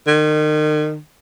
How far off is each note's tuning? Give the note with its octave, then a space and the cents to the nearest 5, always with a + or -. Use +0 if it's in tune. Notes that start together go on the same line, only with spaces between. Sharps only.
D#3 -35